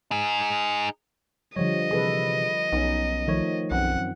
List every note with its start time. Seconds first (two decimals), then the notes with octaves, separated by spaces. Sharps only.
0.11 D#4 G#4
1.56 D3 F3 G3 C#5 D#5
1.91 C3 E3 G#4 A4 B4
2.72 B1 B3 C#4 D#4
3.27 D#3 F3 A3 C#5
3.71 B1 F#2 C4 F#5